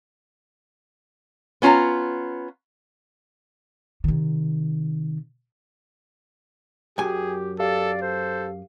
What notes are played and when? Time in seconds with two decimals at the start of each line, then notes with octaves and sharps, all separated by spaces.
1.62 B3 C#4 F4 F5 A#5
4.04 C3 D#3
6.98 F#2 G4 G#4 G5 G#5
7.60 G4 A4 D5 F5
8.01 A4 C5